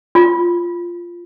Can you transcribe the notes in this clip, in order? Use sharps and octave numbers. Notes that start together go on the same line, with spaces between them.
F4